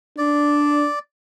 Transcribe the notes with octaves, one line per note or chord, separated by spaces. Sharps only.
D4 D5